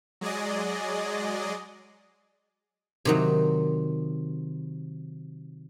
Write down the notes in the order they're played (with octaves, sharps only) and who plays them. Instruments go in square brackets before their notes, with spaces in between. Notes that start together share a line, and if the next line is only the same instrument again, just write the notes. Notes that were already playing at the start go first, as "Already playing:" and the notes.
[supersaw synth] F#3 G#3 G#4 D5 D#5
[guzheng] C3 D#3 F#3